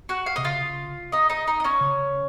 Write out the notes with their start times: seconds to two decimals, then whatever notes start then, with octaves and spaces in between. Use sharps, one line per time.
0.09 F#4 F#5
0.26 F5
0.36 C3 D#5
0.44 C#3 F4 F5
1.12 D#4 D#5
1.29 D#4 D#5
1.47 D#4 D#5
1.60 D#5
1.64 C#4 C#5
1.81 C#3